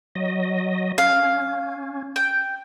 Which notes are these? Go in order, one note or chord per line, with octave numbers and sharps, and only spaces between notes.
F#3 D#5
C#4 F5
G5